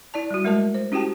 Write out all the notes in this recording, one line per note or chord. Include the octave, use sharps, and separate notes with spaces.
E4 D5 A5
G3 F#4
G#3 A3 A#4 D#5 A5
C5
C#4 E4 F#4 G4 G5 A5